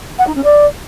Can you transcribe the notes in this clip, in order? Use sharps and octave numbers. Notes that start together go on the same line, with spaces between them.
F#5
D#4
C#4
D5